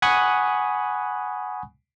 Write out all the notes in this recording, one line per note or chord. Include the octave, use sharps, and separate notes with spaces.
F#5 G#5 B5 C#6 D#6 F#6